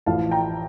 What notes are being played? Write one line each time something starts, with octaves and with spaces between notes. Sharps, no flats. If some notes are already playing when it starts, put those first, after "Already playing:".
A1 A2 F3 F5 A5
G5 A#5